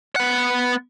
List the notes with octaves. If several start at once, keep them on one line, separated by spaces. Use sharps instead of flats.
B3 F#5